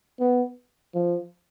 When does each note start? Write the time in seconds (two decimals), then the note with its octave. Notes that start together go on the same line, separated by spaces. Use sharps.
0.19 B3
0.94 F3